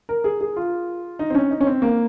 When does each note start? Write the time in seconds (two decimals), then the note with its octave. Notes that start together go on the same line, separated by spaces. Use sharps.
0.09 A#4
0.24 G#4
0.41 G#4
0.56 F4
1.19 D#4
1.30 C4
1.35 C#4
1.51 D#4
1.61 C#4
1.67 C4
1.82 A#3